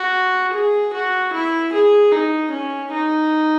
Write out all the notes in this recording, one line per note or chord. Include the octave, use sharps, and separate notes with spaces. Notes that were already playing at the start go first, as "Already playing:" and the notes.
Already playing: F#4
G#4
F#4
E4
G#4
D#4
C#4
D#4